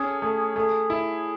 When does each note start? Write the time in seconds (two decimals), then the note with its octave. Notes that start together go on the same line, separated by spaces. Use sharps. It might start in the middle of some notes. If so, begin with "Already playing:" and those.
Already playing: C#4 G#4 A4
0.22 A3
0.56 A3 G#4
0.90 E4